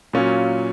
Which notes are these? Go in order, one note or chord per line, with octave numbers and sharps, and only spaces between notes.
A#2 F#3 C#4 F4